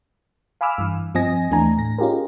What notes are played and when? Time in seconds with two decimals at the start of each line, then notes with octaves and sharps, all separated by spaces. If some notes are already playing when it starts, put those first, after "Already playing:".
0.61 F5 G#5 B5 D6 E6 F6
0.78 G2 E3
1.14 G2 F3 C4 D#5 G#5 A#6
1.51 D#2 E3 A3 D4 G#5 A#5
1.78 A2 A#6
1.98 C#4 D#4 F4 G4 G#4 A#4